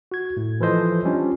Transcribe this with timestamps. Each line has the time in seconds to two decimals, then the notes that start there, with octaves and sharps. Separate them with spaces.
0.12 F#4 G#6
0.37 A2
0.60 E3 F3 A4 C5 D#5
1.05 G3 C#4 D4 F4